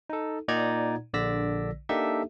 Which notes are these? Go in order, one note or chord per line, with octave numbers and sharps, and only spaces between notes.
D#4 A4
A#2 D#4 D5 F#5 A#5 G#6
A#1 D3 D5 E6 A#6 B6
A#3 D4 D#4 G4 A4 E5